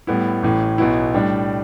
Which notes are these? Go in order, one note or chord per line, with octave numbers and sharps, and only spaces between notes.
A2 G3 B3 E4
A1 A2 E3
B1 B2 B3 E4
A2 G3 D4